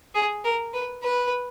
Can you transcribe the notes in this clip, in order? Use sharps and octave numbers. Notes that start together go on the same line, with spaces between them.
G#4
A#4
B4
B4